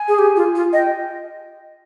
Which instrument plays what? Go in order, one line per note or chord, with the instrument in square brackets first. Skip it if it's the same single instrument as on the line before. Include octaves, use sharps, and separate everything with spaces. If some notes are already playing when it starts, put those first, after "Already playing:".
Already playing: [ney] G#5
[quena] G#4
G4
F4
F4
[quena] D#5 [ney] G5